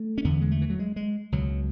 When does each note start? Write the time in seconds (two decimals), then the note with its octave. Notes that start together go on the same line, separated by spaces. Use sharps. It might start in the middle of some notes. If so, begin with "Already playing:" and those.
Already playing: A3
0.18 C#4
0.25 E2 D3 B3
0.41 G#3
0.51 A3
0.61 E3
0.70 F#3
0.79 G#3
0.96 G#3
1.32 C#2 B2 F#3